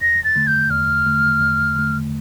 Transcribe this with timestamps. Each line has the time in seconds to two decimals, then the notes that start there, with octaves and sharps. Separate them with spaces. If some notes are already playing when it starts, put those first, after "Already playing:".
0.01 E2 A#6
0.24 A6
0.36 D3 A3
0.47 G6
0.70 E2 F6
1.06 D3 A3
1.41 E2
1.76 D3 A3